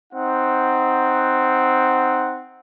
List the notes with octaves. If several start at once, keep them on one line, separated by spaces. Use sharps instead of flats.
C4 D#4 F#5